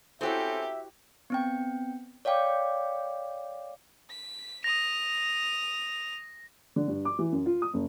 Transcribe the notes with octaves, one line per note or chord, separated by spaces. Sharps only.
C4 C#4 E4 F#4 G4 A4 C5 E5
B3 C4 G5
C#5 D5 F5 G5 D6
B6
D#6 A#6 F7
D3
G2
D6
E3
F#2
F4
D#6
F#1